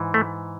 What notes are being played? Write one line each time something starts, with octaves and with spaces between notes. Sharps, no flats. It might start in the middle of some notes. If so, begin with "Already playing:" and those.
Already playing: G#2 E3
A3